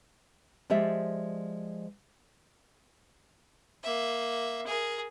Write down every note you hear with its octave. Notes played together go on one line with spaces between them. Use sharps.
F3 G#3 G4 D5 E5
A#3 E5
G#4 A#4